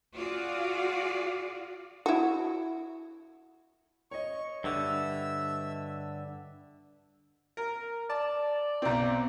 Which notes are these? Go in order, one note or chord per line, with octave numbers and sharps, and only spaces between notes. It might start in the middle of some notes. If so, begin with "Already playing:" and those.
F4 F#4 G#4 D5 F5
E4 F#4
C#5 D#5 C#6
G2 D3 E5 E6
A#4
D5 A5
B1 C4